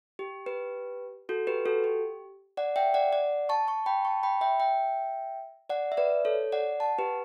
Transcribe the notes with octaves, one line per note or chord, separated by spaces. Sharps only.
G4
G4 B4
F#4 A4
G4 B4
F#4 A4
G4
D5 F#5
E5 G5
D5 F#5
D5 F#5
A5 C#6
A5 C#6
G5 B5
A5 C#6
G5 B5
E5 G5
E5 G5
D5 F#5
E5
B4 D5
A4 C#5
D5 F#5
F#5 A5
G4 B4